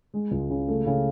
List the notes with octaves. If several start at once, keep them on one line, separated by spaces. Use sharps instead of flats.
G#3
C#2
C#3
A3
C#3